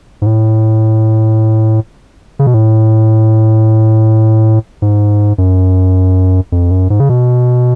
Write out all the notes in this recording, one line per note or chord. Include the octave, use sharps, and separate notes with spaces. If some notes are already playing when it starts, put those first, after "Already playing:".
G#2
A2
C#3
B2
A2
G#2
F#2
F2
F#2
G#2
C#3
B2